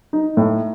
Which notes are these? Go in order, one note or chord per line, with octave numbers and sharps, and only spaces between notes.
D#4
A2